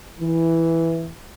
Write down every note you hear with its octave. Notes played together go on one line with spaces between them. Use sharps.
E3